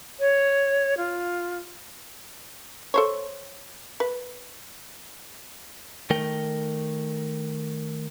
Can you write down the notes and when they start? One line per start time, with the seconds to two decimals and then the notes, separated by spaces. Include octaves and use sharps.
0.20 C#5
0.97 F4
2.94 A4 C5 C#5
4.00 B4
6.10 D#3 A3 A#4 G5